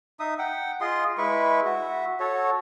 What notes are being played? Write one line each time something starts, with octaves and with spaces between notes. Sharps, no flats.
D#4 E5 D#6
F#5 G5
F4 G#4 D#5 C6
G#3 E4 B4 C#6
F#4 E5
F#4 A4 C#5